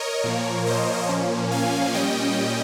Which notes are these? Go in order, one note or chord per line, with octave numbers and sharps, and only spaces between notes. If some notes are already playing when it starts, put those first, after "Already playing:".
Already playing: A#4 C#5 D#5
A#2 F3 A#3
C5 D#5
A#2 F3 A#3 C#4
F5 G#5
A#2 G3 C#4 D#5 G5